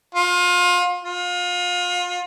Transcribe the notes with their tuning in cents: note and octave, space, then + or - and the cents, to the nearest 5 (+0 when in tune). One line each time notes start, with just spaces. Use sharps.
F4 +30
F4 +30